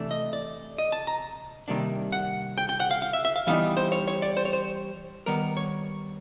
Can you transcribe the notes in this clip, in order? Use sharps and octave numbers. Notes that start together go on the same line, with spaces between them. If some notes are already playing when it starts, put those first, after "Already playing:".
Already playing: C3 E3 A3 D4
D#5
D5
D#5
A5
A#5
C3 D#3 G3 A#3 D4
F#5
G5
G5
F#5
F5
F5
E5
E5
F5
E3 G3 B3 D#4 F5
C5
C#5
C#5
D5
C5
C#5
C5
D#3 G3 B3 A#4
C#5